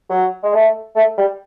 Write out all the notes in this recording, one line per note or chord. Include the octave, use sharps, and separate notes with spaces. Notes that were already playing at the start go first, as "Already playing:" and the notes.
F#3
G#3
A3
A3
G3